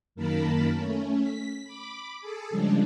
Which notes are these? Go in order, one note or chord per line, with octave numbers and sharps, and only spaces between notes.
F#2 D#3 A#3 A#4 A5 B5
A3 C#4
B6
B5 D6
G#4 A4
C#3 F3 G3 G#3 D4